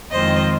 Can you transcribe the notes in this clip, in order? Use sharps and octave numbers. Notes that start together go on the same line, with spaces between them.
F2 D#3 G#3 C4 F4 C5 D#5